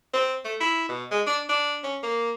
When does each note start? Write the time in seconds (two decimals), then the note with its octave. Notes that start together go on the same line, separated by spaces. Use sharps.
0.13 C4
0.45 A3
0.60 E4
0.89 B2
1.11 G#3
1.26 D4
1.49 D4
1.84 C#4
2.03 A#3